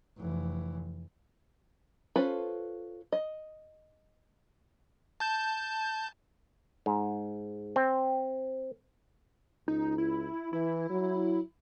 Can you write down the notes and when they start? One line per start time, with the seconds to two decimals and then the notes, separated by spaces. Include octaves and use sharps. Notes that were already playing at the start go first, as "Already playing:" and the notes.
0.18 F1 E3
2.16 C#4 F4 A4 B4 C5
3.12 D#5
5.20 A5 G6
6.86 G#2
7.76 C4
9.68 C#2 D#4
9.98 E4
10.53 E3 E4
10.90 F#3